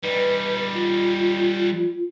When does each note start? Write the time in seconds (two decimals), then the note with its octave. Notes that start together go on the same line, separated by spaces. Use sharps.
0.03 G3 D#4 B4
0.75 F4